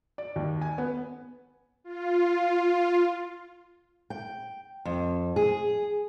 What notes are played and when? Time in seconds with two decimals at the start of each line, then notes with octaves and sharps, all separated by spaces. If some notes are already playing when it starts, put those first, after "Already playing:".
0.18 D5
0.36 D#2
0.61 G#5
0.78 B3
1.84 F4
4.10 G5
4.85 F2
5.36 G#4